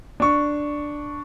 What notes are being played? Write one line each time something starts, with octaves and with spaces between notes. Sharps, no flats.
D4 C#6